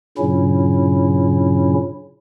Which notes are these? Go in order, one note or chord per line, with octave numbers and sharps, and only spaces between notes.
G2 A#2 C#3 F#3 C#4 E4